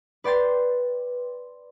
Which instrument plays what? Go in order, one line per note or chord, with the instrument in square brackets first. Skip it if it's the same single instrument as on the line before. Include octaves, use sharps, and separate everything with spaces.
[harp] B4 D5 G5 C6 A6